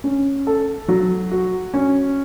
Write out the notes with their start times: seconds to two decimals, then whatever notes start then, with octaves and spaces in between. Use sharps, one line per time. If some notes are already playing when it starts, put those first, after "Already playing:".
0.04 C#4
0.47 A4
0.88 F#3
1.32 F#4
1.74 C#4